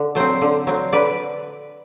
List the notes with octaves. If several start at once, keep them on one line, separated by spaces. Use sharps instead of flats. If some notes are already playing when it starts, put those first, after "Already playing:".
Already playing: D3
F#3 C4 A4 C5
D3
F#3 C4
D3 B4 D5